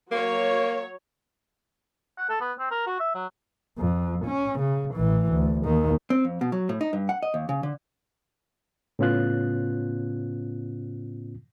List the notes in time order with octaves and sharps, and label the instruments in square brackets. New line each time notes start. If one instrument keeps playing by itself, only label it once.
[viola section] F#3 C#5 [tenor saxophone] A#3
[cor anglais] F#5
A4
B3
C4
A#4
F#4
E5
F#3
[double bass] F2
C#4
C#3
A1 E3
D2
D#2 D#3
[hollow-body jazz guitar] C4
F2
B2
F#3
A2
D#4
G2
F#5
D#5
D#2
C#3
D3
[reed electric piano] A2 C#3 B3 C#4 F4 F#6